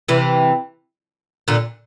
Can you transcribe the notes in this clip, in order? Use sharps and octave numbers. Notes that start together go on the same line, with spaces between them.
C3 E3
A#2 D3